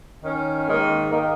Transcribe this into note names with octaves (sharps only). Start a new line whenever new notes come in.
D#3 C#4
G#2 D#3 A#3 D#4
D#3 A#3 D#4